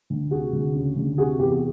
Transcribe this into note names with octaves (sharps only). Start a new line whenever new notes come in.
D2
C3 F#4 G#4
D2
C#3
D2
C3 F#4 G#4
E2 G4